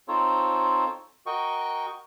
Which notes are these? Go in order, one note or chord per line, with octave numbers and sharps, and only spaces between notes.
C4 D#4 F4 A4 C5 C#5
F#4 A#4 D#5 G5 C#6